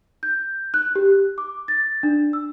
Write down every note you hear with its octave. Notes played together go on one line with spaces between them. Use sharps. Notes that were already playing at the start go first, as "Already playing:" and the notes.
G6
F#6
G4
F#6
D6
A6
D4
E6